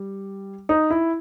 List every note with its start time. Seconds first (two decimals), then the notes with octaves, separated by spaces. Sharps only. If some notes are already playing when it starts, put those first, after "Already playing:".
Already playing: G3
0.69 D#4
0.90 E4